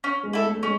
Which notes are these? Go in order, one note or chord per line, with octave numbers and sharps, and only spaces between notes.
C#4
G#3
E4 A4
A3
A3
G#3 C#4